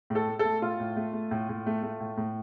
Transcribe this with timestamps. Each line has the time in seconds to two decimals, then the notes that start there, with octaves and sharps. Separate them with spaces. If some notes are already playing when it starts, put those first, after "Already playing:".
0.10 A2 A4
0.28 A3
0.39 A4
0.45 A3
0.62 A2 F4
0.80 A2
0.96 A3
1.13 A3
1.31 A2
1.49 A2
1.66 A3
1.83 A3
2.00 A2
2.17 A2